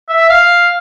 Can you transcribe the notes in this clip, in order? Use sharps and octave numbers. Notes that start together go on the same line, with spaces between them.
E5
F5